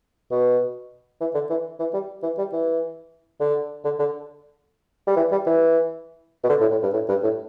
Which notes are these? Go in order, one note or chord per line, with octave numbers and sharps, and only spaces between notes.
B2
E3
D3
E3
E3
G3
E3
G3
E3
D3
D3
D3
G3
E3
G3
E3
B2
D3
A2
A2
G2
A2
G2
A2